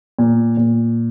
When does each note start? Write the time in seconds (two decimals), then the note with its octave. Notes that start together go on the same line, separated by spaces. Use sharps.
0.19 A#2
0.57 A#2